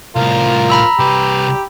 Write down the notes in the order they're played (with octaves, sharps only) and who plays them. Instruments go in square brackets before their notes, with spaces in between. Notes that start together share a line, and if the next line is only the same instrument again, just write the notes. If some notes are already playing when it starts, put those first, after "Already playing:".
[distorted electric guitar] C2 A2 [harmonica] F3 F4 A#4
[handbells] A#5 B5 E6
[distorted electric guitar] C2 B4 [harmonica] G4